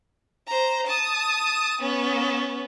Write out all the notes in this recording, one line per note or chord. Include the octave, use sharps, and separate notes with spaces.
C5 A#5
A5 D#6
B3 C#4